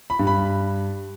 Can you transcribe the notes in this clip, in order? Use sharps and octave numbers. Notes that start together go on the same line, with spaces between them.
B5
G2
B5